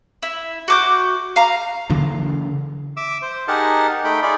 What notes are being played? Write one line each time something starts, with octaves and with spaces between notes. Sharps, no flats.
E4
F#4 D6 G6
F5 A#5
C#3 E3 F#3 A#3
E5 D6 E6
C5
D#4 G4 G#4 A#4 F#5 A5
A3 D#4 G5 B5
D#4 F4 G#4 D5 B5